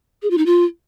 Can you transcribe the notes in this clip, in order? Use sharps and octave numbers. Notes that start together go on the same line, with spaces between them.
G#4
F4
D#4
F4